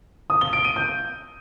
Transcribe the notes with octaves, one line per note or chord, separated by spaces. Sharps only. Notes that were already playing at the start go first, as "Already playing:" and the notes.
D#6
G7
D7
D#7
G6